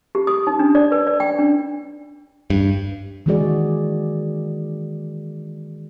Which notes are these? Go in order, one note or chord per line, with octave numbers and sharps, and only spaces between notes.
G4
D#6
D#4
D4
D5
B4
D5
G5
D4
G2
D#3 E3 G#3 F#4 G#4 D5